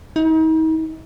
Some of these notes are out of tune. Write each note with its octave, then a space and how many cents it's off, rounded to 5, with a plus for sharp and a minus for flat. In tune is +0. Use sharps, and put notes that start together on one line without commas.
D#4 +40